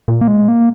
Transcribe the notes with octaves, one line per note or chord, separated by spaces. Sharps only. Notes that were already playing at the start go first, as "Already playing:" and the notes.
A#2
A#3
G#3
A#3